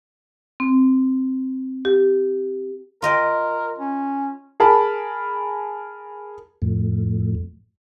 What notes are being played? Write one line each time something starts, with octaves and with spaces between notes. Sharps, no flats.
C4
G4
F4 A#4 D#5 G5
C#4
G#4 A#4 A5 B5
F2 A2